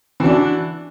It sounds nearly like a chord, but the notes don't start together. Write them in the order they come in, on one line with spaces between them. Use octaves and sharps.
E3 F#4 D4